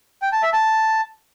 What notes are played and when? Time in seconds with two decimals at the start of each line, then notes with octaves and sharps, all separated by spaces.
0.22 G5
0.32 A5
0.43 E5
0.53 A5